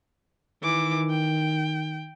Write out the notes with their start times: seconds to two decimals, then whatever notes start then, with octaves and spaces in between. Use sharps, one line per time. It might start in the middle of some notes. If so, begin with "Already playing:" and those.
0.63 D#3 E3 D6
1.10 G5